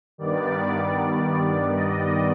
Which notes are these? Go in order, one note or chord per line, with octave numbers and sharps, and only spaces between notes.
G2 D#3 G3 B3 D5
D#5